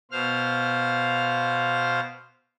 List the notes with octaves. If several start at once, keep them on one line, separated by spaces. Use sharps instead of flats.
B2 C5 F5 F6